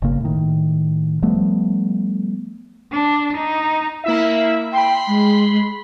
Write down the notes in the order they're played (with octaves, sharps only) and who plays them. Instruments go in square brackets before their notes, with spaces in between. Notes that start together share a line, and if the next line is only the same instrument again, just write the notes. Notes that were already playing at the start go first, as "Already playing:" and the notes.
[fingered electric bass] G1 C#3 A#3
A2 D#3
F3 G3 A3 B3
[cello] D4
D#4
[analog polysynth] A#3 E4 E5
[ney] G5 [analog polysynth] B5 C6
[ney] G#3